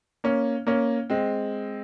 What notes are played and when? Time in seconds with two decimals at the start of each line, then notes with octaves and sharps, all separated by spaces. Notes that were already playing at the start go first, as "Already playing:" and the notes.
0.24 A#3 C#4
0.67 A#3 C#4
1.10 G#3 C4